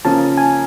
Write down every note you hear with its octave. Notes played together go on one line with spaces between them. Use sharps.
C#3 F3 A#3 C#4 A5
G#5